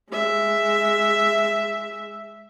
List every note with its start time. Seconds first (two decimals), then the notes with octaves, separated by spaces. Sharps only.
0.11 G#3 E5